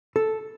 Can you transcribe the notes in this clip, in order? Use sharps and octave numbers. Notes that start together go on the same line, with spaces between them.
A4